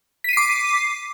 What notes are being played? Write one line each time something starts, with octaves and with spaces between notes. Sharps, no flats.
D6 B6 C7 D#7